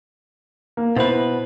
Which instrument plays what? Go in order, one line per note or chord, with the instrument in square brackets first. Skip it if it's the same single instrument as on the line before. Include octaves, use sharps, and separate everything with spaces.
[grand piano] A#3
[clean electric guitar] B2 B4 [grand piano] E4 C5